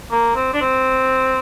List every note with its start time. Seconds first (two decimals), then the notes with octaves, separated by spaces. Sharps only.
0.11 A#3
0.36 C4
0.53 D4
0.61 C4